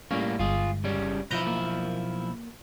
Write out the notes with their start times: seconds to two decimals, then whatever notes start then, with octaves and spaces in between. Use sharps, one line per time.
0.11 A2 G3 A#3 C#4
0.39 G1 G#3 F4 G#4
0.84 C#3 G3 C#4
1.31 B1 F3 E4 B4 A#5 G6
1.47 A#3